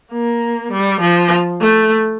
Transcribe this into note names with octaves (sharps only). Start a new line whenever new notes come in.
A#3
G3
F3
A3